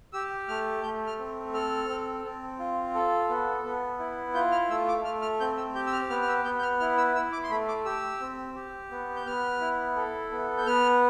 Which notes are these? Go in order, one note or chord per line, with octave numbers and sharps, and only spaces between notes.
G4 E6
A3 F6
A3 G6
F6
C4
A4 F6
C4
C4
F4
A4
B3
B3
E4
F4 G6
F6
A3 E6
D6
A3 F6
F6
C4 G6
E6
G4 G6
E6
F6
B3 F6
F6
E6
B3 G6
G6
F6
E4 F6
E6
E4 E6
D6
C6
A3 B5
D6
G4 E6
C4
G4
B3
G6
B3 F6
E4
A4
B3
G6
B3 F6